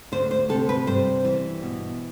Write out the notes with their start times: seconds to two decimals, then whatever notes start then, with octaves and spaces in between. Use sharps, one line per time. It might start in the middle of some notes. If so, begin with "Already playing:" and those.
0.12 D2 C5
0.31 C5
0.49 C3 A4
0.69 B4
0.87 G2 C5
1.25 E3
1.62 B2